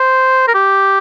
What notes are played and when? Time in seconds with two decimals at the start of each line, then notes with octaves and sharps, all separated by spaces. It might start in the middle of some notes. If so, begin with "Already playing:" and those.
Already playing: C5
0.48 A#4
0.54 G4